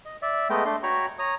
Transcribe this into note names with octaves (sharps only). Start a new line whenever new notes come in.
D#5
D5 E5
G#3 A3 B3 D#5 G5
A3 D4 C6
F#4 C#5 G5 A#5 B5 C#6
C#5 A#5 D#6